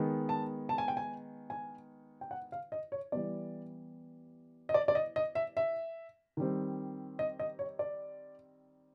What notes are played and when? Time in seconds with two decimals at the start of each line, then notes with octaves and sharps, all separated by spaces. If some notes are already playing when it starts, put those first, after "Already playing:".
Already playing: D#3 G#3 B3
0.29 A5
0.69 A5
0.78 G#5
0.88 G5
0.97 G#5
1.50 G#5
2.21 G5
2.31 F#5
2.52 F5
2.72 D#5
2.92 C#5
3.12 E3 G3 B3 D5
4.69 D#5
4.74 D5
4.88 D5
4.95 D#5
5.16 D#5
5.35 E5
5.57 E5
6.37 D#3 G3 C4
7.19 D#5
7.39 D#5
7.59 C#5
7.79 D5